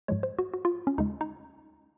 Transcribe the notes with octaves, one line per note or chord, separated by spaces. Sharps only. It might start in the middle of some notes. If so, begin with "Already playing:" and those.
G#2 F3 G#3 C#5
C5
F#4
F#4
F4
C#4
D#2 C#3 G#3 D#4
D#4